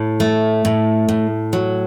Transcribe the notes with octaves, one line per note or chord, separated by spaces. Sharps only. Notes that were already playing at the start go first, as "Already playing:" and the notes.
Already playing: A2
A3
A2
A2
F#3